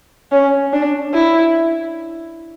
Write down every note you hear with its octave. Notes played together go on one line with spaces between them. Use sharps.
C#4
D4
E4